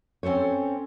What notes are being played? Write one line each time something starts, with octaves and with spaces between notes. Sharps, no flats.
C4 C#4 A4 C5 C#5